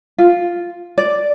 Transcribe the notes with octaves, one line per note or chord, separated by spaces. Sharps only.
F4
D5